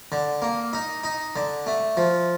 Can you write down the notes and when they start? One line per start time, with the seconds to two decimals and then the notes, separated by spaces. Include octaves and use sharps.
0.12 D3
0.42 A#3
0.73 D#4
1.04 D#4
1.36 D3
1.67 A3
1.97 F3